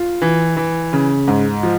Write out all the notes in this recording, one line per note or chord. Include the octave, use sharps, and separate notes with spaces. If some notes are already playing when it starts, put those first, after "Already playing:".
Already playing: F4
E3
E3
C#3
G#2
F3